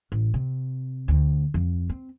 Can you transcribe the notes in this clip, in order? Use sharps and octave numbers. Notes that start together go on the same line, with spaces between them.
A1
C3
D2
F2
C4